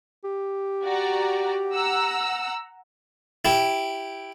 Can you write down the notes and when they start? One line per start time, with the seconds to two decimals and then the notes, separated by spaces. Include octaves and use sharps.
0.24 G4
0.83 F#4 D5 A#5
1.74 F#5 A#5 E6
3.45 E4 G4